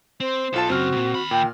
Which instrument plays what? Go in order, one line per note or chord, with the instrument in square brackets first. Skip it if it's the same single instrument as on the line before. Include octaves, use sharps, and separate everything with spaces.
[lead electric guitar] C4 [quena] C5
[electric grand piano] B1 F4 A5 [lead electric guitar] A4
[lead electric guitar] F#2 C#3 [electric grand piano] C4 F6 [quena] F#4
[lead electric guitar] C2 A#2
D#2 B5
[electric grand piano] A#2 [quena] G5